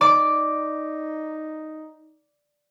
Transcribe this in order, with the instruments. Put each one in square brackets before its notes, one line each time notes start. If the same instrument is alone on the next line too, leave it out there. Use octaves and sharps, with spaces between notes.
[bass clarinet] D#4 [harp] D5 D6